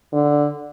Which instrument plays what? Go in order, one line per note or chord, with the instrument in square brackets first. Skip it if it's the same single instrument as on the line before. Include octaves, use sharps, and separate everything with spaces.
[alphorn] D3